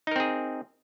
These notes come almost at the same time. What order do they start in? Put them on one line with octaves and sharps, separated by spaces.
D#4 A#4 C4 G#4